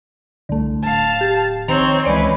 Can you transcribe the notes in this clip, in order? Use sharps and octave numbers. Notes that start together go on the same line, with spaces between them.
C2 D3 A3
D1 F5 A5
G4
A#1 D#3 C4 C#5 A#5 F7
C#2 E3 G#3 C#4 B4 D5